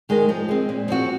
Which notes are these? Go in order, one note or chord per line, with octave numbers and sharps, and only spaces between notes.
D#3 G#3 D#4 A#4
F3
G#3 C4
A#2
F3 C4 F#4